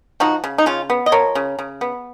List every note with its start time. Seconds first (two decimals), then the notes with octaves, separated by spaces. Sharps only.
0.20 F3 D#4 F#4
0.44 C#3
0.58 D#4
0.66 C#3 C#4 F4
0.90 B3
1.06 D#5
1.12 F3 A#4 C#5
1.35 C#3
1.59 C#3
1.81 B3